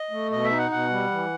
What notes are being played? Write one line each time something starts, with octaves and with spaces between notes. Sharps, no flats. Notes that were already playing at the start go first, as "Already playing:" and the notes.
Already playing: D#5
A3
B2 D#5
E5
D#4
F#5
B2 F#5
G3
E3